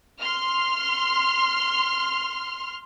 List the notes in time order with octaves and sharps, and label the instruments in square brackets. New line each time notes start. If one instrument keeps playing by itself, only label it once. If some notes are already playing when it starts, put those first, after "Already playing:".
[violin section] C6 F6